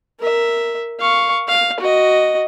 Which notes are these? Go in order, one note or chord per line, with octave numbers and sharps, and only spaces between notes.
A#4 E5
F5 C#6
F5
F#4 D#5